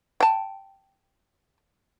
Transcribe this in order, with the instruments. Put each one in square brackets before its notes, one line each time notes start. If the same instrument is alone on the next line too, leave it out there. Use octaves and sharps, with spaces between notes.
[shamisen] G5 A5